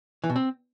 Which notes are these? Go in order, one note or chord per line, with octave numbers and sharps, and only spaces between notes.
E3
B2
C4